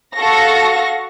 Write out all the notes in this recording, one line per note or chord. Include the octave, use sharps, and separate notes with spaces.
F#4 A4 F5 C#6 A#6